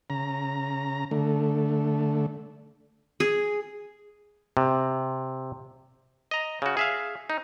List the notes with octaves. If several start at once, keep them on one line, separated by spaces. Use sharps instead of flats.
C#3 A#5
D3 A3
G#4
C3
D#5 A#5
C#3 F#4
G#4 E5 F5
D#4